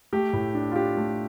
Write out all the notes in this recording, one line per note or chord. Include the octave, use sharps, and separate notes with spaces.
A3 G4
A2
D4
F4
D4 G4
A3